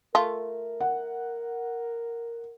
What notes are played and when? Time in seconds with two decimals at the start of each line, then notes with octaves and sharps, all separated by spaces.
0.15 A3 F4 A#4
0.80 F#5